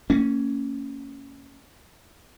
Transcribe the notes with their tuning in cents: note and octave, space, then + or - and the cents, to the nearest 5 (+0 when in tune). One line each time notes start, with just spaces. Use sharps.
A#3 -35 C#4 +0